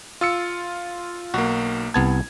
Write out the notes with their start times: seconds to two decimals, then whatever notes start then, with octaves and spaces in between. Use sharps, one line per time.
0.21 F4 E6 C#7
1.34 B1 A#3 F#4
1.94 C2 B3 A5 G#6